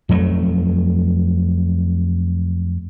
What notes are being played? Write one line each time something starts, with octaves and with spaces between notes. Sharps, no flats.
F2 F#3 G3 A3